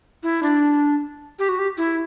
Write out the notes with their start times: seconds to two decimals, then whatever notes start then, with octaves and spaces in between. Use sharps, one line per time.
0.23 E4
0.43 D4
1.39 G4
1.49 F#4
1.59 G4
1.77 E4